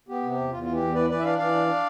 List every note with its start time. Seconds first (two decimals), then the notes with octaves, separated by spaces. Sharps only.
0.09 B3 G4
0.23 C3
0.30 G4
0.37 E2
0.51 E2 F4
0.63 E3 F4
0.73 G4
0.80 E2
0.95 E3 B4 D5
1.09 E3 B4 D5
1.20 E5
1.24 D4 D5 F5
1.38 E3 D5 F5
1.53 D4
1.68 D4